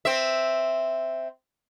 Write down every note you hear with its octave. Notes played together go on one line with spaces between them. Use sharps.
C4 E5